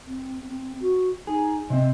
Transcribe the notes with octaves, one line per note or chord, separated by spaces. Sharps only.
C4
C4
F#4
D#4 G#4
C3 C4 D#5